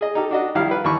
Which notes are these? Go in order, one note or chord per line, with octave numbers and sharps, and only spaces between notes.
G#4 D#5
D#4 G4 A4
D4 F#4 D#5
A#1 D#3 G3 E4 F5 F6
B4
D#2 E3 B5 C#6